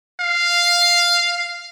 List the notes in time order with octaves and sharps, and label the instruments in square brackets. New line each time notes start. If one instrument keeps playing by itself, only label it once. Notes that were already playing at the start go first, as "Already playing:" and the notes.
[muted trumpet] F5